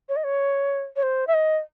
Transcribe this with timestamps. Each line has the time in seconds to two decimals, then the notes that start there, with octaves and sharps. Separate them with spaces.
0.09 C#5
0.16 D#5
0.24 C#5
0.96 C#5
1.03 C5
1.27 E5
1.34 D#5